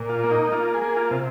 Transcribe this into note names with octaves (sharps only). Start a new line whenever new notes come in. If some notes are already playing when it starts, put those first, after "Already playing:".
Already playing: A#2
F4
A#3
D#4
A#3 F4
G#4
A#3
F4
C3